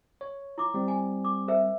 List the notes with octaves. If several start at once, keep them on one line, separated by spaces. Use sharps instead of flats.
C#5
E4 D6
G3 C4
G#5
D6
A#4 C5 E5